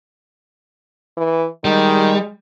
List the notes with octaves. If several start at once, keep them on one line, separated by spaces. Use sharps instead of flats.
E3
D#3 G3 G#3